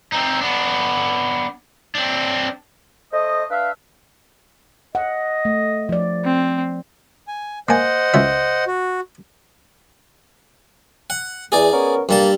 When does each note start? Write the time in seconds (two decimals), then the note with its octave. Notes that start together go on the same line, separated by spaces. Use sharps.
0.12 C4 D#4
0.41 B3 D4
1.95 C4 D4
3.12 A3 C5 D#5
3.50 D4 B4 E5 F5
4.95 D#5 F#5
5.45 A3
5.89 F3 D5
6.25 C4
7.28 G#5
7.69 A#3 C5 D#5 F#5 G#5
8.14 C#2 E5
8.67 F#4
11.10 F#5
11.52 E2 G#4 D5
11.72 B3 C#4 A#4
12.09 G2 G3 A#3 A5